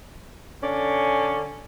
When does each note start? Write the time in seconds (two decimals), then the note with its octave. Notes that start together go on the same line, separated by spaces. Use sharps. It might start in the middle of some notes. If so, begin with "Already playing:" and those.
0.64 D3 C#4 D5